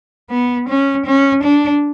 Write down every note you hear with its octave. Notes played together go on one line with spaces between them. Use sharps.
B3
C#4
C#4
D4